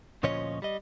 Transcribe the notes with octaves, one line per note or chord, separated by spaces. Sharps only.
D2 A#2 F3 C#4 C#5 D#5
G3 D#5